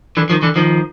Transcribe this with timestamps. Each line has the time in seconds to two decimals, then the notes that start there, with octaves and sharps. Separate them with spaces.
0.17 D3 E3
0.30 D#3 F3
0.42 D3 E3
0.56 D#3 F3